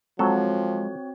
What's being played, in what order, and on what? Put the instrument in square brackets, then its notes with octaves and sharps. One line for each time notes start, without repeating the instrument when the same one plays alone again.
[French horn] F3 [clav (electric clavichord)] F#3 A4 [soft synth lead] G#3 [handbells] C4 F#4 C#5